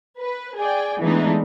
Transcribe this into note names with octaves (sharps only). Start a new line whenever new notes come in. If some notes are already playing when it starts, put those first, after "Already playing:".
B4
G#4 D5 G5
E3 G#3 A3 B3 D4 D#4